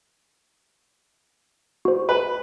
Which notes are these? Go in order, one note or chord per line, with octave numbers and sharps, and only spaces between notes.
F#4 C5
B4